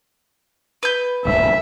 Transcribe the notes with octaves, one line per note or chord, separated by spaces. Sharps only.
B4 G6
D#1 C#2 G2 E5